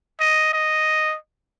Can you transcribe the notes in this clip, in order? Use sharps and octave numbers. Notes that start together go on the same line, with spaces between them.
D#5
D#5